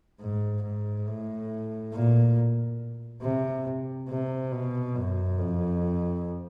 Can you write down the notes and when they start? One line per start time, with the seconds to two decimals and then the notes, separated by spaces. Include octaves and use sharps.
0.20 G#2
0.63 G#2
1.07 A2
1.93 A#2
3.22 C3
4.09 C3
4.52 B2
4.95 F#2
5.39 F2